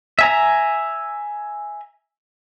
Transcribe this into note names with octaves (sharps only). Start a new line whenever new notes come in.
E5 G#5 A#5